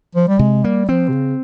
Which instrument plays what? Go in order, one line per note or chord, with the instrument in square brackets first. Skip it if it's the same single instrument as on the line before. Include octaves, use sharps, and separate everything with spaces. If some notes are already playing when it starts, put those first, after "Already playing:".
[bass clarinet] F3
G3
[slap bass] C3 [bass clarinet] G#3
[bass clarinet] G3 [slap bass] A#3
[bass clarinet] F3 [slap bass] C4
[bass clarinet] C3
C#3